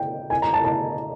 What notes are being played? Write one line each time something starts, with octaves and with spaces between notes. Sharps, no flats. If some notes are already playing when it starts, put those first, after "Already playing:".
Already playing: G5
G#5
A#5
A5
A5